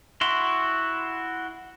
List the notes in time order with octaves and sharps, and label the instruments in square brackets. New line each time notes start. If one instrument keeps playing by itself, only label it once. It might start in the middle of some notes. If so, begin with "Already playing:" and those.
[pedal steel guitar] E4 F#4 C6